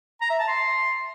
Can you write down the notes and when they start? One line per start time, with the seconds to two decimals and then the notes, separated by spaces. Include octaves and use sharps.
0.21 A#5
0.30 E5
0.39 A5
0.48 C6